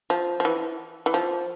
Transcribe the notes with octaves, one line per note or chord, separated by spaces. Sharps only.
F3
F3
E3
E3
F3